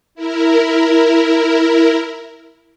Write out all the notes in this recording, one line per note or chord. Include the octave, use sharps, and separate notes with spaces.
E4 A#4